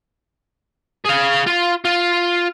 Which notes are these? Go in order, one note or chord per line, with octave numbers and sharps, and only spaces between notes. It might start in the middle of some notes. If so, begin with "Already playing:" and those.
G#4 F5
F4
F4